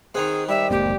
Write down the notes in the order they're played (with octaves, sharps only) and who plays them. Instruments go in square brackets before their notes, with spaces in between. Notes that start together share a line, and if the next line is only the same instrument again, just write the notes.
[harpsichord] D#3 C4 [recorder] G#4 [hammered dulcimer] F#5
[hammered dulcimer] G3 [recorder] E5
[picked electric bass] F#1 A3 B3 [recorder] G4